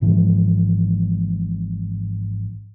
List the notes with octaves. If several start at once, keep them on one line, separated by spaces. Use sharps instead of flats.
G#1 G#2 E3 F3